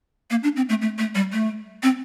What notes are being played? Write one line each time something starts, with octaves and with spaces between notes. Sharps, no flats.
A#3
D4
C4
A3
A3
A3
G3
A3
C4